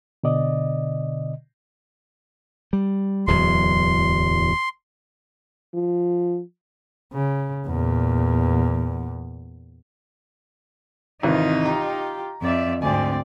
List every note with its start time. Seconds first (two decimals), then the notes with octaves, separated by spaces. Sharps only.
0.24 B2 D3 D5 D#5
2.73 G3
3.27 D1 E2 F#3 C6
5.74 F3
7.13 C#3
7.67 E2 A#2
11.23 G#1 C3 E3 D#4 F4
11.66 F4 G4 A#5
12.42 F2 D5 E5
12.82 D2 G#2 C4 D5 G#5